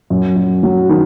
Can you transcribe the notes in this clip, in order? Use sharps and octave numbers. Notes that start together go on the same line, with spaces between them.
F#2
F#2
F#3
D#3